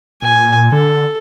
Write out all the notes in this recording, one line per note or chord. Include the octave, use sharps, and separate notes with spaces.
A#2 G#5
D3 A4